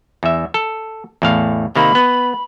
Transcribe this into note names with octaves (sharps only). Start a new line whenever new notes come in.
E2 E5
A4
E2 A2 F5
C3 D#3 A#3 B5
B3